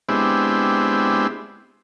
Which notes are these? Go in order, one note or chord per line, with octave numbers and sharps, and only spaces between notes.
G#3 B3 C4 D4 E4 G4